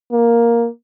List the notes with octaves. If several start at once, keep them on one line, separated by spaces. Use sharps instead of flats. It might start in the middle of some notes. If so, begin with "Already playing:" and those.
A#3